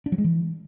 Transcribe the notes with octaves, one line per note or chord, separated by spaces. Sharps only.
D4
F#3
G#3
E3